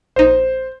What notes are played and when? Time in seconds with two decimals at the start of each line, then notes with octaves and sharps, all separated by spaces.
0.16 A#1 D#4 C5